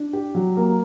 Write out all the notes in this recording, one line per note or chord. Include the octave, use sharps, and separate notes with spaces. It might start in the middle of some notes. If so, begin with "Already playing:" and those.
Already playing: D4
G4
F#3
A#3